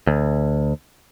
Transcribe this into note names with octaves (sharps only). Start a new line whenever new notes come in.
D2